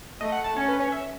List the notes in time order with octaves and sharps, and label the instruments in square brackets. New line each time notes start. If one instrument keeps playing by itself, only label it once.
[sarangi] A3 [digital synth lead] D#5
[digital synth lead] F#5
A5
[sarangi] C#4 [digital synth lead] C#5
[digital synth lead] B4
C#5
E5